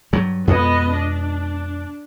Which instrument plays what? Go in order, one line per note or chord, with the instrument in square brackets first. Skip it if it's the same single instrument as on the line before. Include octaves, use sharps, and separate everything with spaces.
[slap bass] G2 F#3
[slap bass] F2 B2 G#3 [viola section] B3 D#5
[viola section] D4